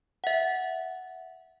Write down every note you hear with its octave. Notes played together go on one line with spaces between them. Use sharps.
E5 F#5